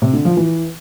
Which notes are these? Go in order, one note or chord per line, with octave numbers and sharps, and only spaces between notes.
C3
D3
F3
E3